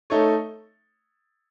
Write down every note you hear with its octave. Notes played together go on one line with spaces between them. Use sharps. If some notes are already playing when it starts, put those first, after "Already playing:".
A3 D#4 A4 C#5